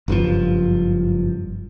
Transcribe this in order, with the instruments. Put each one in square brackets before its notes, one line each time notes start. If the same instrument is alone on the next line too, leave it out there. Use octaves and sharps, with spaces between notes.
[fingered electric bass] F#1 G2 B2 F3